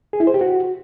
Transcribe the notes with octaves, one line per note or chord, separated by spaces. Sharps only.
G#4
E4
C5
G4
F#4